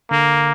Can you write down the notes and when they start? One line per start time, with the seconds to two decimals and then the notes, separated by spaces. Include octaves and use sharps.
0.11 D3 A#3